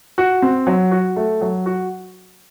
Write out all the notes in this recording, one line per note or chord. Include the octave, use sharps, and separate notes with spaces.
F#4
C4
F#3
F#4
A3
F#3
F#4